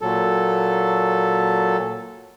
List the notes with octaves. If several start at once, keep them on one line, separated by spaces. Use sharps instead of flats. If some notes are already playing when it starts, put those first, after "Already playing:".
A#2 F#3 A4